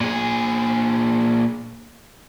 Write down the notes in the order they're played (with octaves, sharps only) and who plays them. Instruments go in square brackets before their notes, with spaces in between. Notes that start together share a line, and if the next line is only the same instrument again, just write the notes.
[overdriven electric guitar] A#2 G#4